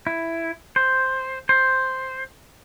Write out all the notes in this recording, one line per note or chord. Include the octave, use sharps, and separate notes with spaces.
E4
C5
C5